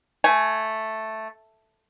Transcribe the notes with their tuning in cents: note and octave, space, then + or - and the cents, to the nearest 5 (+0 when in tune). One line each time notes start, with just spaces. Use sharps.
A3 +0 G#5 +15